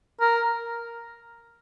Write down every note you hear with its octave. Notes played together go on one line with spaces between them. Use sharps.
A#4